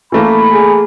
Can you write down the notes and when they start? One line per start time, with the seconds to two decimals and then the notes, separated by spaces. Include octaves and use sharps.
0.12 E3 A3 A#3 B5
0.51 G#4